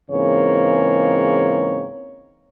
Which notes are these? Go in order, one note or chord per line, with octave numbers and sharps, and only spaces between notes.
G#2 C#3 E3 A#3 C4 C#5